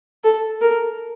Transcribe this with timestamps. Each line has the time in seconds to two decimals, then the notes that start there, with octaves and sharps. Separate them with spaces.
0.24 A4
0.62 A#4